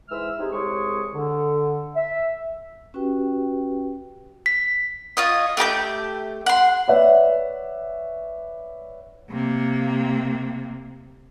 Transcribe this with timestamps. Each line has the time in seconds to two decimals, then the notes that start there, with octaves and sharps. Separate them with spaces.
0.09 G#2 E3 G#3 E5 E6 F6
0.39 G#3 C4 D#4 G4 G#4
0.52 C2 C3 G#3 G#4 C#5 C#6
1.13 D3
1.95 E5
2.94 C#4 F#4 G4 B4 G5
4.46 B6
5.17 F4 C#5 D#5
5.57 A3 G4 A#5 G6
6.46 F#5 C6
6.88 B4 C#5 D5 E5 F#5
9.30 C3 A#3